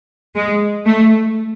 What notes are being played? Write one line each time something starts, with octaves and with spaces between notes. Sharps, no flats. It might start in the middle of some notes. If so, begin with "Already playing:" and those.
G#3
A3